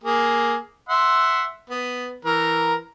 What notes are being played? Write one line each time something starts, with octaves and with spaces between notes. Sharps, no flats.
A#3 G#4
E5 F#5 C6
B3
E3 A#4